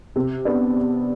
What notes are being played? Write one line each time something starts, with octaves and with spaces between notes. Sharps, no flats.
C3
B3 D4